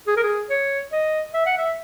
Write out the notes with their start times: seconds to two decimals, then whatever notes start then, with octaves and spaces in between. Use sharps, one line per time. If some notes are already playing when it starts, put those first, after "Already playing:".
0.07 G#4
0.16 A#4
0.23 G#4
0.50 C#5
0.92 D#5
1.34 E5
1.46 F#5
1.58 E5